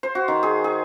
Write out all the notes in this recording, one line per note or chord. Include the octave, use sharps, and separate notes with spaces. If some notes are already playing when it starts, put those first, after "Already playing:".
C5
F#4
D#3
G#4
G#4